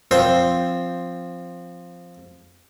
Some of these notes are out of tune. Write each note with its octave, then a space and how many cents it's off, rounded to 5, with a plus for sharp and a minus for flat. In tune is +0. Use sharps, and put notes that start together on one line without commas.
F3 +0 C4 +0 C5 +0